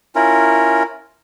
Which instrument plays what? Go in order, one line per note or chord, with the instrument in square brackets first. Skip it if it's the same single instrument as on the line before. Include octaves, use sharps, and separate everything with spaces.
[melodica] C#4 E4 F4 A#4